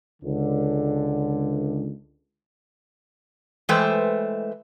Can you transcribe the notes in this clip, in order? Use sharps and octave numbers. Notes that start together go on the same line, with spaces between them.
C#2 D3
E3 G#3 A3 B4 C5 G5